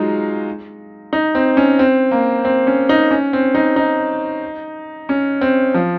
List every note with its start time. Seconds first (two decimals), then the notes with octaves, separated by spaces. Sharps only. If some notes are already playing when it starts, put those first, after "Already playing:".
Already playing: F#3 G#3 D#4 F4
1.13 D#4
1.35 C4
1.57 C#4
1.79 C4
2.11 A#3
2.45 C4
2.67 C#4
2.89 D#4
3.11 C#4
3.33 C4
3.55 D#4
3.76 D#4
5.09 C#4
5.41 C4
5.74 F3